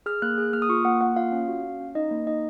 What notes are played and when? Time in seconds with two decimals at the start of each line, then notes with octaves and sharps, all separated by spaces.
0.06 G#4 F6
0.22 A#3 F#6
0.38 G#4
0.53 A#3 F6
0.62 D#6
0.69 F4 C#6
0.85 A#3 F#5
1.01 A#3 F#5
1.16 F4 F5
1.32 C#4
1.48 F#4
1.64 C#4
1.80 C#4
1.95 D#4 D#5
2.11 A#3
2.27 D#4 D#5